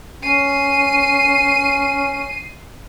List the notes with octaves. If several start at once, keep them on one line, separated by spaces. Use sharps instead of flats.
C#4 C7 D#7